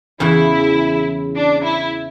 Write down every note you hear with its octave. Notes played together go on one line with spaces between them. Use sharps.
E2 C#3 E3 E4
D4
E4